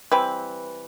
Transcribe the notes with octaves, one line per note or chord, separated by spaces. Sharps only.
E3 G3 C4 B4